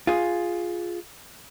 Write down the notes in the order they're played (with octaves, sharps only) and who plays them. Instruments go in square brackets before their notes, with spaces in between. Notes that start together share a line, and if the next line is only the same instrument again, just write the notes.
[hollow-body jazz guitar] F4 G#4